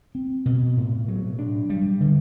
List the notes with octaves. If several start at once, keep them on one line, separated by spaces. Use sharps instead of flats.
C4
B2
A2
F#3
D4
G3
D3